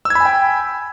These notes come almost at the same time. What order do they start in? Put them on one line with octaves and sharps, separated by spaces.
E6 G#6 B5 G#5 G5